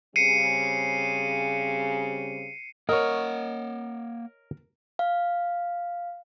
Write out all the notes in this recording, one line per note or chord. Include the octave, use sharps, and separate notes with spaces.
C#3 G3 C4 C7 C#7 D#7
A#3 A#4 C#5 D#5 F#5
F5